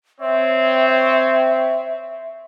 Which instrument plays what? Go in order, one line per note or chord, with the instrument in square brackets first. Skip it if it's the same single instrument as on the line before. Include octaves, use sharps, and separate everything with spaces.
[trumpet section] C4 C#5 [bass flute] E5